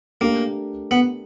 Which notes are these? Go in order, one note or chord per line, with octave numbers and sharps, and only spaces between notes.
A3 A#3 D4 G4 A#4
B3